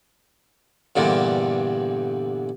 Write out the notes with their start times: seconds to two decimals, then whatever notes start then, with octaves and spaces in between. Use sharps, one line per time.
0.96 E2 G2 A#2 D3